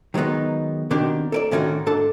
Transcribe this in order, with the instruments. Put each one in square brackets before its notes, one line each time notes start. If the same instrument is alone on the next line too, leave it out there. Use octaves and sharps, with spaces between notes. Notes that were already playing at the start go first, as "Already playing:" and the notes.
[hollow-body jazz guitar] D#3 F#3 G#3 B3 D#4
B2 D#3 C4 D4 G4
A4 A#4 D5
A2 D3 D#3 C#4 D#4 F#4
G#2 D4 A4 A5